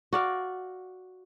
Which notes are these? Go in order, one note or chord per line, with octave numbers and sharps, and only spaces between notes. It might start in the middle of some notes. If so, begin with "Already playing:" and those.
F#4 D5 F5